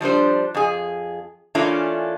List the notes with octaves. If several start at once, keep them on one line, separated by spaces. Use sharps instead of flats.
F3 G3 D4 C5
F2 G#4
E3 A3 A#3 C#4 D4 F4